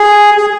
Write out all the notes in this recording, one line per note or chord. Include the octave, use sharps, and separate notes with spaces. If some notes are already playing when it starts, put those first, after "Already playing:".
Already playing: G#4
G#4